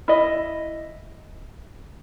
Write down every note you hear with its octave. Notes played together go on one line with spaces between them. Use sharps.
E4 D#5